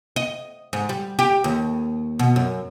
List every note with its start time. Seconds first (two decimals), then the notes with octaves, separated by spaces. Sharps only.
0.16 D#5
0.73 G#2
0.89 G3
1.19 G4
1.44 D#2
2.19 B2
2.36 F#2